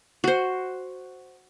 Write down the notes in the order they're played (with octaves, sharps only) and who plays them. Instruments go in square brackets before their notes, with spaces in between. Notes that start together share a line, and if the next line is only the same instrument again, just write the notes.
[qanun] F#4 C5